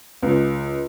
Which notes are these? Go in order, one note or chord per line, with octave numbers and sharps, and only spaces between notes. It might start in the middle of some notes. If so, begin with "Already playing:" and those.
C#2